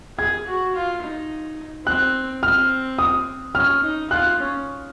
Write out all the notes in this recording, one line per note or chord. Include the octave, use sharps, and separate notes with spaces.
G#4 G#6
F#4
F4
D#4
C4 F#6
C4 F6
D#6
C#4 F6
D#4
F4 F#6
C#4